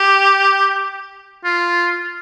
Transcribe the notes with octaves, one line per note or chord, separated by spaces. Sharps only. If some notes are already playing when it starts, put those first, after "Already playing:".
Already playing: G4
F4